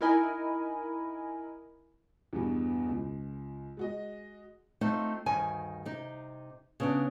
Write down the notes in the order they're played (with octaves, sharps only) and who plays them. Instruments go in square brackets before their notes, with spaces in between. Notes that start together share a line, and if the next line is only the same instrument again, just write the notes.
[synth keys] D#4 E4 A#4 D#5 G#5 B5
[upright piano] E2 G2 B2
C#2
G#3 F#4 D#5
[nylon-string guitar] A3 C4 D#4 F4
D2 G2 D#3 G#5
C3 D#4
C#3 B3 D4